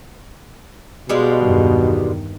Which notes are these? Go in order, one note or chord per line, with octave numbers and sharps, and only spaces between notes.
B2 G3 G#3 F4
E2 G2 D#3